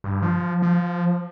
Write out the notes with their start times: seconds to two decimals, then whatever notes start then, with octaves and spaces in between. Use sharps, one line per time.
0.04 G2
0.22 F3
0.62 F3